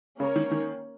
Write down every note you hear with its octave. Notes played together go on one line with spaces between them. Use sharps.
C#3 A#3 C#4 A#4 C#5
D#3
D#3